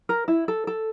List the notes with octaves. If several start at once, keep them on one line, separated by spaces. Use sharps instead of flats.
A#4
E4
A4
A4